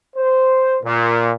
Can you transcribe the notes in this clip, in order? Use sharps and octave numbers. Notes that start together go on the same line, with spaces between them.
C5
A#2